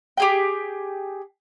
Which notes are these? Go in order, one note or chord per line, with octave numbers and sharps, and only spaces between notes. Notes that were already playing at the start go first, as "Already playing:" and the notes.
G4 G#4 G5